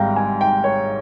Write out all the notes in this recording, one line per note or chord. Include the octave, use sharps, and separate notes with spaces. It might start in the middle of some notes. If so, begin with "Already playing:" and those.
Already playing: G#1 G#2 G3 F5 G5 A#5
G#5
G5
C#5